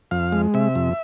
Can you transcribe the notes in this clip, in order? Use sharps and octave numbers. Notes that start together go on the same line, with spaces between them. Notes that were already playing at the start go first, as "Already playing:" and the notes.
F2 F5
G#3
C3 E5
F2